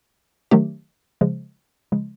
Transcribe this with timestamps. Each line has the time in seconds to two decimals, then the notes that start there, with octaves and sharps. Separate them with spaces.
0.51 D#3 F#3 A3 D4 G4
1.21 C#3 F3 G#3
1.92 C#3 F3 G#3